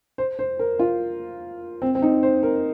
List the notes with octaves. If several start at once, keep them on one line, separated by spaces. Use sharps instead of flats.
C5
C5
A#4
F4
C4
C4
D#4
C5
A#4